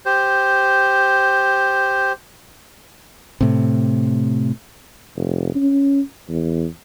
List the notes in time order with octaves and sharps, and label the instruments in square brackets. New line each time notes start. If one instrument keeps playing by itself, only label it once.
[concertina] G4 C5
[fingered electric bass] A2 C3
[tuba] F1
C#4
E2